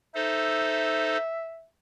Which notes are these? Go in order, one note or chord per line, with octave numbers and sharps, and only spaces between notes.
D#4 A4 C5 E5